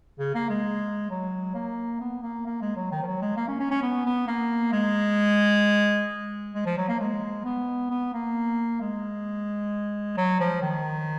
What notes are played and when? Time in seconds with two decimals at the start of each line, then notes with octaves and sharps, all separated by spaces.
0.19 C#3
0.34 A#3
0.49 G#3
1.10 F#3
1.55 A#3
2.01 B3
2.23 A#3
2.46 A#3
2.62 G#3
2.76 F#3
2.92 D#3
3.02 F3
3.07 F#3
3.22 G#3
3.36 A#3
3.48 C#4
3.60 C#4
3.71 C#4
3.82 B3
4.05 B3
4.27 A#3
4.72 G#3
6.54 G#3
6.65 F3
6.77 F#3
6.89 A#3
7.00 G#3
7.44 B3
7.90 B3
8.14 A#3
8.81 G#3
10.17 F#3
10.40 F3
10.62 D#3